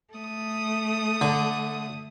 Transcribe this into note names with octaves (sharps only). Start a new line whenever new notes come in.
A3 D#6
D3